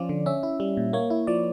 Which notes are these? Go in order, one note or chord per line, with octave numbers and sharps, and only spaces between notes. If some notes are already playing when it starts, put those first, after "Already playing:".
Already playing: F3 C#4 F4 D5
D3
C#4 E5
E4
G3
A#2
A#3 C#5
E4
F3 D5